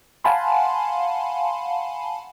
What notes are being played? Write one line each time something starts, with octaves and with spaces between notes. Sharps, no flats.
F5 F#5 G#5 A5 B5 C6